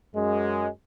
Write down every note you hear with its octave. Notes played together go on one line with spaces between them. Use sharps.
F#2 G#3